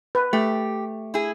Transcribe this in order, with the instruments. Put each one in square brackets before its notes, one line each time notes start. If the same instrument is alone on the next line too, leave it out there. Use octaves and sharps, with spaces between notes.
[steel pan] B4
[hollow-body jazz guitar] A3 [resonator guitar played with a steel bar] G4
[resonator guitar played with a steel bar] E4 G#4